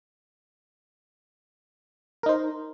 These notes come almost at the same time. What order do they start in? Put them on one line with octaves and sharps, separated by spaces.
A#4 D#4 C5